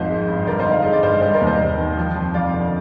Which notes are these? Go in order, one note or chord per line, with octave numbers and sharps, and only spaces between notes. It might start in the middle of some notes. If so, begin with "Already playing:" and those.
Already playing: G#1 F2 F3 C5 D#5
G#3
G2
D3 A#4 D5
C5 D#5
G#1
F5
G#3 D#5
D5
G2 C5 D#5
G3 C5 D#5
A#4 D5
D#2
C5 D#5
D#2
D#3
F3
F2
F2 D5 F5
D3